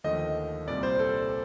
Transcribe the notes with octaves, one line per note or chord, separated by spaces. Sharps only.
D#2 D3 F3 A3 D#5
C2 A#2 G3 D5
C5
A4